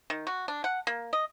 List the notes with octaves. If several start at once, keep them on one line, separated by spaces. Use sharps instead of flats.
D#3
F#4
D4
F#5
A#3
D#5